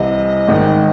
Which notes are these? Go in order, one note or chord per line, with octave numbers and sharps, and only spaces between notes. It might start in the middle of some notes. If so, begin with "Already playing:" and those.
Already playing: C2 C3 E3 D#5
G#1 G#2 D#3